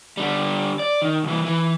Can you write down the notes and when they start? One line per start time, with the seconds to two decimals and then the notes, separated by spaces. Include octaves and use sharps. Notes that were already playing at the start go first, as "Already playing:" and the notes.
0.17 D3 G3
0.79 D5
1.02 D#3
1.23 C2 E3
1.45 E3